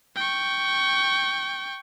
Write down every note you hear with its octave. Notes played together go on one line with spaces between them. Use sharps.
G5 C#6